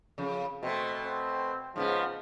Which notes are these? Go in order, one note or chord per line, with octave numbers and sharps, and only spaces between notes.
F2 C#3
B2 A3 C4
C4
G#2 C#3 F3 B3